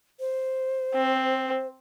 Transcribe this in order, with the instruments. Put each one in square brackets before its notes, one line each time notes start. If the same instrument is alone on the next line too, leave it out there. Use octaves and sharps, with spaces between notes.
[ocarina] C5
[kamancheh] C4